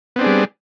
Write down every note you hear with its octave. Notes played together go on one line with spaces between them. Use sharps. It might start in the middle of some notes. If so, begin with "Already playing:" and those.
G3 B3 C4 D4 G#4